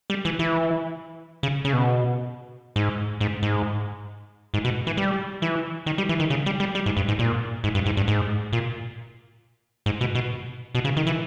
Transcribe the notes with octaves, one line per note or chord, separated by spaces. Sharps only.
G3
E3
E3
C#3
C#3
B2
G#2
G#2
G#2
G#2
B2
E3
G3
E3
D#3
G3
E3
D#3
C#3
G3
G3
G3
G#2
G2
G#2
A#2
G#2
G2
G#2
G2
G#2
A#2
G#2
B2
B2
B2
C#3
D#3
E3